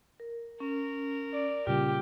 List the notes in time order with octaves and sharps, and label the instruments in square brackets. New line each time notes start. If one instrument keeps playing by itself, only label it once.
[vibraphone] A#4
[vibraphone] C#4 [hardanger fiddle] A#4
[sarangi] D5
[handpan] A#2 C#3 G3 [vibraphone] F4 [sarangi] G4